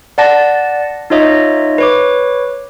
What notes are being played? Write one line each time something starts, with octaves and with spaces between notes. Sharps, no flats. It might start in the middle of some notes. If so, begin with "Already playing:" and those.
D5 F#5 A5 A#6
D#4 F4 C#5 D#5 E5
B4 C#5 D6